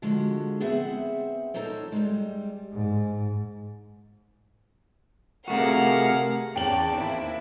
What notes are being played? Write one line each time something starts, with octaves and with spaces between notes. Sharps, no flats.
D3 F3 G#3 F#4
B3 C4 G#4 C5 E5 F#5
D#4 A4 A#4 C5 C#5
G3 G#3
G#2
C3 A3 F#4 G#4 A#4 F5 F#5
E2 C#4 C#5 D5 G5 A5 D6 F#7
D#2 A#3 C4 E4 D7